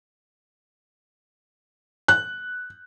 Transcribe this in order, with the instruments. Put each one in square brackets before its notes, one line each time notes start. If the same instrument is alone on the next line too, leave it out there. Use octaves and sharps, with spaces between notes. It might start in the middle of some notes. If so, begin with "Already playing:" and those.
[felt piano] F#6